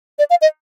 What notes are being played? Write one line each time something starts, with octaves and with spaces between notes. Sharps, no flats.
D5
F5
D#5